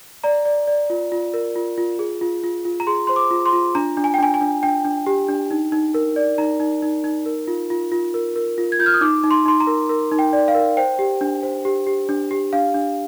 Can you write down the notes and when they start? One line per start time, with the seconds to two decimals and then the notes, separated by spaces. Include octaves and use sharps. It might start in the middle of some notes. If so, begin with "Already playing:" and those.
0.24 D5 A#5
0.45 D5
0.67 D5
0.90 F4
1.12 F4
1.34 A#4
1.56 F4
1.78 F4
1.99 G#4
2.21 F4
2.43 F4
2.65 F4
2.80 A#5
2.87 G#4 C6
3.07 C5 C6
3.16 D6
3.31 F4
3.46 C6
3.53 F4
3.75 D4 A#5
3.97 D4
4.04 G#5
4.14 G5
4.19 D4 G#5
4.34 G#5
4.41 D4
4.63 D4 G5
4.85 D4
5.06 G4
5.28 D4
5.51 D#4
5.72 D#4
5.94 A#4
6.16 D5
6.38 D#4 A#5
6.60 D#4
6.82 D#4
7.04 D#4
7.26 A#4
7.48 F4
7.70 F4
7.92 F4
8.14 A#4
8.36 A#4
8.58 F4
8.72 G#6
8.79 F4 G6
8.86 F6
8.94 D#6
9.01 D#4 D6
9.23 D#4
9.31 C6
9.46 D#4 C6
9.60 A#5
9.67 A#4
9.89 A#4
10.11 D#4
10.19 G5
10.33 D5
10.48 F5
10.55 A#4
10.77 C5 G5
10.99 G4
11.21 D4
11.43 C5
11.65 G4
11.87 G4
12.09 D4
12.31 G4
12.53 D4 F5
12.74 D4